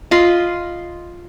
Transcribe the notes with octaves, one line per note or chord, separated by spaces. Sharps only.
F4 D#5 B5 C6